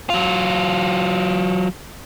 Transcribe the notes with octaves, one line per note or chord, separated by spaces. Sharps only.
F#3 F4